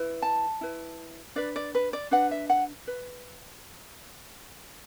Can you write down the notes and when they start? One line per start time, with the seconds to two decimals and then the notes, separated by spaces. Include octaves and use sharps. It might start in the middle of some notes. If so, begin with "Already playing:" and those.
Already playing: E4 B4
0.22 A5
0.61 E4 B4
1.36 D4 B4 D5
1.56 D5
1.75 B4
1.93 D5
2.11 D4 B4 F#5
2.31 E5
2.50 F#5
2.87 B4